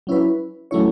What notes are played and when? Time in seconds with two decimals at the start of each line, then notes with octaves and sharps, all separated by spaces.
0.07 F#3 C#4 E4 B4
0.71 F#3 A3 C#4 E4 C#5